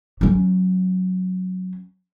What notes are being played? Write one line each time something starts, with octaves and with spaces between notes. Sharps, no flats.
F#3 C#4